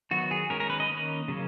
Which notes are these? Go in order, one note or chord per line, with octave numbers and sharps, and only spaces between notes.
D#3 F#3 B3 F#4
G#4
D#3 G#3 C#4 A#4
A#4
B4
D#5
D#3 A#3 C#4
C#3 F#3 A#3 C#4